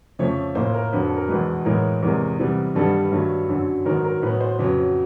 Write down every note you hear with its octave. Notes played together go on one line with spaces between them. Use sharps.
F2 C#3 F3 A3 C#5
A2 F3 A#3 C5
A#4
F2 D3 F#3 B4
A4
A#4
E2 B2 G#3 B4
A2 E3 G#3 B3 A#4
E2 C3 E3 G#3 A#4
C3 E3 G3 B3
G2 D#3 G3 B3 A4
G2 D#3 F#3 A3
F#2 D3 F#3
G#2 D#3 F#3 B3 A#4
A#4
A2 F#3 B3 B4
C5
F2 C#3 F#3 B3 B4